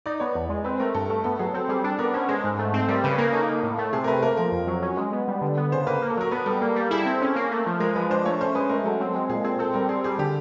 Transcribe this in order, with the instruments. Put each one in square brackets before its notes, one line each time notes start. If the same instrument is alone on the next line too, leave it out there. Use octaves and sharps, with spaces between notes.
[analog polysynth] D#4 [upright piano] D5
[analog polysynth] B3 [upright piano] C#5
[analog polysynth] E2
G#3
[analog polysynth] C4 [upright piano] B4
[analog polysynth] A3 [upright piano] A#4
[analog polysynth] G2 [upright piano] A4
[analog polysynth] A3 [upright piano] A4
[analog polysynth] B3 [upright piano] A4
[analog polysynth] F#3 [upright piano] G#4
[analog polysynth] C4 [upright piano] A4
[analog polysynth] G3 [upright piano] G#4
[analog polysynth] D4 [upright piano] A4
[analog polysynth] B3 [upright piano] A#4
[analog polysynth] C#4 [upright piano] C5
[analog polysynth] G#3 [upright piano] C5
[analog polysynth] G#2
A3
C4
[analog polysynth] G3 [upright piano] A#4
[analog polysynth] C#3 [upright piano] B4
[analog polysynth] A#3 [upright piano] A#4
[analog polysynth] D#4 [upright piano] A4
[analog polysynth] A#3
A2
A3
[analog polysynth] C3 [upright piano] G#4
[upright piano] A#4
[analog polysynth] A3 [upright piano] B4
[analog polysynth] A#3 [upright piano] A#4
[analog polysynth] F3 [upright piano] A#4
[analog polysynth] F2
F#3
C#4
G#3
B3
G3
D3
B3
[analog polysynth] C#3 [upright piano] C5
[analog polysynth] A#3 [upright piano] B4
[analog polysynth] A#3
[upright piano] A4
[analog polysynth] F#3 [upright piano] A#4
[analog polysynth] B3 [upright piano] B4
[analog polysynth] G3 [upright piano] A4
[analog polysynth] A#3
G3
[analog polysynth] E4 [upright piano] G#4
[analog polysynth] C4 [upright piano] A4
[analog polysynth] C#4
A#3
A3
F3
[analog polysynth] G#3 [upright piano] A#4
[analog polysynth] F3 [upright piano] B4
[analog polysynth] D4 [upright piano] C5
[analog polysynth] A3 [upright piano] C#5
[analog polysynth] C#4 [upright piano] C5
[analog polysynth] G#3 [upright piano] B4
[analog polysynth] A3 [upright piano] A#4
[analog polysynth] F#3 [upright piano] A4
[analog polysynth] C4
G#3
[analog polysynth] A#2 [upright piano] G#4
[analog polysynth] C4 [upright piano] G#4
[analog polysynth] C4 [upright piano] A4
[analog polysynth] G3 [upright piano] A#4
[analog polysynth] C4 [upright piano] G#4
[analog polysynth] G3 [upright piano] G#4
[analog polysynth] D3 [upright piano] G4